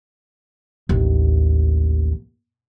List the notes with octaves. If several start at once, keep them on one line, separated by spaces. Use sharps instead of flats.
A1 D#2